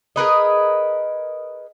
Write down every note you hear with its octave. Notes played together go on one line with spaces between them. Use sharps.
G#4 A#4 B4 D#5